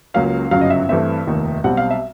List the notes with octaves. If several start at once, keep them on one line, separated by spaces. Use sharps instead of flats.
C#2 C#3 F#3 A#3 C#4 F5
G1 F#2 C#3 F#3 F5
D#5
E5
G2 E3 A3 C4 E5
F1 D#2 D#3
B1 B2 G3 C4 F#5
F5
E5